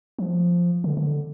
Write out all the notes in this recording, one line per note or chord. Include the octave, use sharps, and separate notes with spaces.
F3
D3
D3